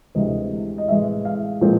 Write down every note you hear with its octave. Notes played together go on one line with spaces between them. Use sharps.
D2 C3 E3 G#3 C4 D#5
D#5
A2 E3 G#3 E5
F5
A#2 F3 G#3 C4